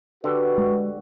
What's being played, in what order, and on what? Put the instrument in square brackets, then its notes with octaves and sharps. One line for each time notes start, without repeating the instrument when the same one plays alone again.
[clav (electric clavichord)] D3 G4 [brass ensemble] F#4 B4
[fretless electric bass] G#3